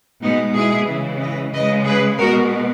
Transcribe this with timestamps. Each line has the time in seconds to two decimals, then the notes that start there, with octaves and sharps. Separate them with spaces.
0.23 B2 G#3 B3 D#4
0.56 E4 G#4
0.88 C#3 E3 G#3
1.21 B4 D#5
1.53 C#3 G#3 B4 D#5
1.86 G#4 B4
2.19 B2 G#3 F#4 A#4